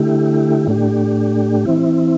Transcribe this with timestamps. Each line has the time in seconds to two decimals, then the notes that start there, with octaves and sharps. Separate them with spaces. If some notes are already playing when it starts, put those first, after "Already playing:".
Already playing: D3 A3 E4 G4
0.67 A2 A3 D4 G4
1.66 E3 C4 E4